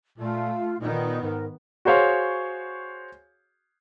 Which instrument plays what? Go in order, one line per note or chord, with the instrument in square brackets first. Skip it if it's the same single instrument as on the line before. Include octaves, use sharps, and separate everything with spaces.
[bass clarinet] A#2 [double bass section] A3 [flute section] F4
[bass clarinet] A#2 [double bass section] D#3 B3 [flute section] D#4
[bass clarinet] G#2 [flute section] A#4
[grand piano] F#4 G#4 C5 C#5 F5